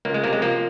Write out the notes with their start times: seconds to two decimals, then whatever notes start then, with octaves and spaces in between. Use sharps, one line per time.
0.05 C#2 A#3
0.14 G#3
0.24 C3 A#3
0.33 G#3
0.42 F3 A#3